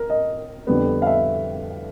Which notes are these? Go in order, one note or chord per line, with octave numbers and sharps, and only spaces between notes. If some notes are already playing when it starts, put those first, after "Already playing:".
Already playing: A#4
D#5
F2 D3 G3 B3
F5
E5